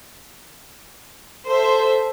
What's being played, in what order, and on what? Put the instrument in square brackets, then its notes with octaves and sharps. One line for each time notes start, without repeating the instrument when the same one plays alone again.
[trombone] A4 [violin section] C5 E5